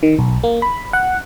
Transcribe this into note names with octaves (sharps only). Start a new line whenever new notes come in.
D#3
B1
A#3
B5
F#5